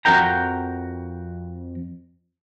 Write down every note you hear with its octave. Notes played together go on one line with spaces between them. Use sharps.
F2 F#4 A#4 G5 A#5